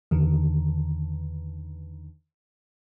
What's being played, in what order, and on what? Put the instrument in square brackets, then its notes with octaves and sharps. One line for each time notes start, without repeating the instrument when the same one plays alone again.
[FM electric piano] E2 D3 D#3